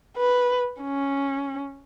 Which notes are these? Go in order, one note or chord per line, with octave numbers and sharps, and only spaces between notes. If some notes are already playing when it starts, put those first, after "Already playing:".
B4
C#4